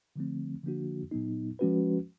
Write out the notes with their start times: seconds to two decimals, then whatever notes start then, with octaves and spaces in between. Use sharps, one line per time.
0.16 D3 F3 A3 C4
0.63 D3 F3 A#3 D4 F#4
1.11 A#2 F#3 B3 D#4
1.59 F3 G#3 C#4 F#4 B4